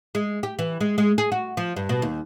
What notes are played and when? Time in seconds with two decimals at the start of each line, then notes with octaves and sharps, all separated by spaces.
0.15 G#3
0.43 G4
0.59 E3
0.81 G#3
0.98 G#3
1.18 G#4
1.32 F#4
1.57 F3
1.76 G2
1.89 B2
2.02 D#2